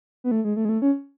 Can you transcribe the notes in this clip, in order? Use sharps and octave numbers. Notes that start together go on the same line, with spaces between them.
B3
A3
G#3
A3
G#3
A3
C#4